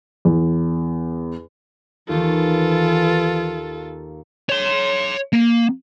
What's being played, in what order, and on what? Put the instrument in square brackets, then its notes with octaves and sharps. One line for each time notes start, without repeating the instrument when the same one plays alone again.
[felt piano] E2
[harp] D#2 [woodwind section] E3 [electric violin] F4 A4
[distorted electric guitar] C#5 C6
A#3